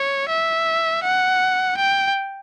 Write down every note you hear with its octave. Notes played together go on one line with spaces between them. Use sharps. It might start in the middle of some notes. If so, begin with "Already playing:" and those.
Already playing: C#5
E5
F#5
G5